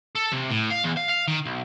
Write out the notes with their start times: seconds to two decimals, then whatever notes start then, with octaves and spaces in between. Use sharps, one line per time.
0.15 A4
0.32 C3
0.51 A2
0.71 F5
0.84 E2
0.97 F5
1.09 F5
1.28 D#3
1.45 B1